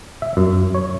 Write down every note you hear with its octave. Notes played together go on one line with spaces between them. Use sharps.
E5
F#2
C#5